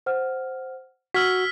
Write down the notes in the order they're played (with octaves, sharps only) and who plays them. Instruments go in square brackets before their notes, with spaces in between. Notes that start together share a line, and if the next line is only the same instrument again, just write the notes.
[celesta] C5 F#5 F6
[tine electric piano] F#4 [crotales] E6 F6 B6 [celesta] G#6 F#7